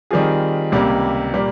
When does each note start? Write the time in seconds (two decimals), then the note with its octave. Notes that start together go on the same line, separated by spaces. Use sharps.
0.11 D#3 G3 C4 F4 G#4
0.72 C#2 C3 G3 A#3
1.33 A#2 G3 A#3